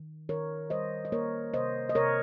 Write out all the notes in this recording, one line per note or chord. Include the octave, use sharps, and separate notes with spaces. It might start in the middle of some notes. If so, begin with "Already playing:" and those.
Already playing: D#3
D#3 A#4 C#5
G3 C5 D#5
D#5
A#3 A#4 C#5
C3 C5 D#5
D#5
C3 A#4 C#5